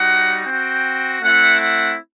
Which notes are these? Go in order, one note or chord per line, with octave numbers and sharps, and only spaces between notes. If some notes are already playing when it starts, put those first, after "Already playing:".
Already playing: G3 D#4 F#4 F#5
C4 F#4 G5
A3 C4 E4 F#5
F#5